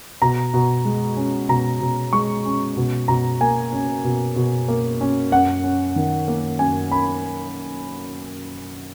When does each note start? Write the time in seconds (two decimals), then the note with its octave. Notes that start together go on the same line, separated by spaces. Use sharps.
0.22 B2 A#5
0.54 B2
0.85 G#3
1.17 C#4
1.49 B2 A#5
1.81 B2
2.13 G#3 C#6
2.45 C#4
2.77 B2
3.08 B2 A#5
3.41 A#3 G#5
3.72 C#4
4.04 B2
4.36 B2
4.68 A#3
5.01 C#4
5.32 F#2 F#5
5.64 C#4
5.96 D#3
6.28 A#3
6.59 F#2 G#5
6.92 C#4 B5